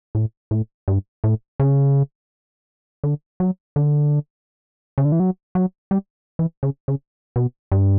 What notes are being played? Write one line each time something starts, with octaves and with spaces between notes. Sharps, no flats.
A2
A2
G2
A2
C#3
D3
F#3
D3
C#3
D3
E3
F#3
F#3
G3
E3
C#3
C#3
B2
G2